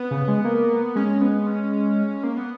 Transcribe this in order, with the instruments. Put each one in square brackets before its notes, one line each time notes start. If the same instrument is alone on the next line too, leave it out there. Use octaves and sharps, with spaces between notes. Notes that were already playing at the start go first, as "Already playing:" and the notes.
Already playing: [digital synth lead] B3
[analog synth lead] C#3
G#3
A#3
[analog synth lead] G#3 [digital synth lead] C#4
[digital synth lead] B3
C#4
A#3
B3